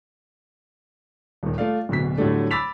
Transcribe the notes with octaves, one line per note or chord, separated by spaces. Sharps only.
D#1 D#3
A3 F4 D5 F5
D1 D2 B2 B6
A2 D3 F#3 G3 A3 D4
B5 D6 E6 A6 B6 F7